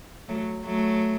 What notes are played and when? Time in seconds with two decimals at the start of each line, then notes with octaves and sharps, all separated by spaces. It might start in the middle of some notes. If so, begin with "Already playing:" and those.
0.28 F#3 A3
0.65 F#3 A3